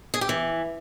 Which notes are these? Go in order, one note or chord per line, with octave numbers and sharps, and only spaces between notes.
G#4
G4
E3